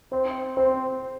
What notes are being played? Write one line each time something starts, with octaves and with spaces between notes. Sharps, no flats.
C4 C5
C4 C5